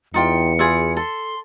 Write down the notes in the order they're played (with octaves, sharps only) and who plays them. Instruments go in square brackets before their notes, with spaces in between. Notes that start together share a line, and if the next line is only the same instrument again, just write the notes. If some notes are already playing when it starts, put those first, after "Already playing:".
[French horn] E2 [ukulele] D#4 F4 G5 [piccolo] C#7
[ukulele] E4 F4 G#4
[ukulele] A4 [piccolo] C6